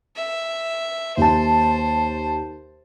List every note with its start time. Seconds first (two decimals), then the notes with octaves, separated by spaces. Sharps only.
0.16 E5
1.17 D#2 C5 A5